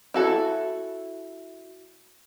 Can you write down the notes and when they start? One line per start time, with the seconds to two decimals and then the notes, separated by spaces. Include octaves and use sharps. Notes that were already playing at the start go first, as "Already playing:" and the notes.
0.14 E4 F#4 A4